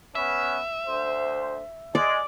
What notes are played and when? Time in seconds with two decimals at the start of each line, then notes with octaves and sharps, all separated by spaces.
0.15 B3 C#4 B4 E5
0.87 D2 C5
1.95 G#3 D5